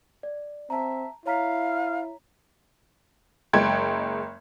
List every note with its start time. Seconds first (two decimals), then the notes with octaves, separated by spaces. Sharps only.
0.23 D5
0.70 C4 E5 A5 A#5
1.26 E4 C#5 F5 A#5 B6
3.53 F#1 G#3 G5 G#6